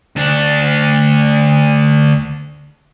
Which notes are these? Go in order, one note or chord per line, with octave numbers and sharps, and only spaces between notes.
D2 D4